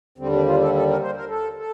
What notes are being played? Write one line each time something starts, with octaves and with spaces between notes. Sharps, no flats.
D#2 D3 G3 C4
D4
F4
A4
A4
A#4
C5
A#4
A4
A4